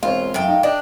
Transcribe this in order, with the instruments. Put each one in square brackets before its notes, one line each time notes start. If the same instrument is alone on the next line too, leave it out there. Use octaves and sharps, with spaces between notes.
[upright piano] E1 C4 C#5 [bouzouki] F4
[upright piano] F#2 [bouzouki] A2 F5 G5
[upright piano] D#4
[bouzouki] D4 [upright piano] D5 D#5 G5